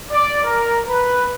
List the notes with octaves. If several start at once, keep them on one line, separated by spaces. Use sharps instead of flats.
D5
A#4
B4